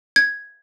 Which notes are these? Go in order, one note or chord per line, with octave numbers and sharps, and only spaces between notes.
G#6